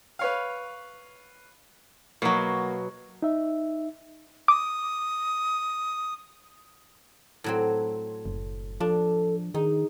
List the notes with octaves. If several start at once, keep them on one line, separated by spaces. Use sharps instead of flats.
B4 C#5 F5
B2 F#3 A#3
D#4 E5
D6 D#6
A2 F#3 C4
F#1
F3 D4 A4
D#3 D#4 G#4